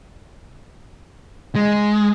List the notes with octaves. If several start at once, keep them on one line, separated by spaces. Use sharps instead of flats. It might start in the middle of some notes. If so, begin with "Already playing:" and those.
G#3